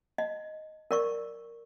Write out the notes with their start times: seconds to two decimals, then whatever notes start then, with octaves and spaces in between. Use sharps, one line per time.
0.18 D#5
0.91 A#4 D5 C#6